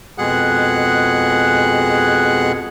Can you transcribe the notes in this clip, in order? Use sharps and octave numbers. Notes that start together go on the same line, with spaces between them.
F2 B2 G#3 G#4 F#5 F#6